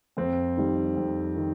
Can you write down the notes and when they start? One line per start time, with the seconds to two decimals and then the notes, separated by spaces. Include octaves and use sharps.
0.17 F2 C4
0.57 D#3 G3
0.97 F2
1.37 D#3